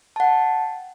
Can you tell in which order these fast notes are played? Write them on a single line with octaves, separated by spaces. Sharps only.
A5 F#5 G5